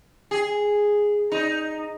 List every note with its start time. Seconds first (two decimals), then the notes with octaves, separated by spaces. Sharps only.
0.31 G#4
1.32 D#4